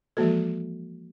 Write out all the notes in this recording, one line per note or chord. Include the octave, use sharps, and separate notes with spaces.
E3 F3 G#3 A#3 F#4 A4